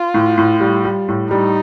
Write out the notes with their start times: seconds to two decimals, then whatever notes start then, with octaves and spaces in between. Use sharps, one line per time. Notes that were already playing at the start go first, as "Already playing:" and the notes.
Already playing: F4
0.14 A2
0.38 A2
0.60 G3
0.85 G3
1.09 A2
1.31 G3 D#4